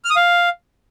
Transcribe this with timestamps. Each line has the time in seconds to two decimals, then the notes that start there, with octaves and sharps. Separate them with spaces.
0.05 F6
0.10 D#6
0.16 F5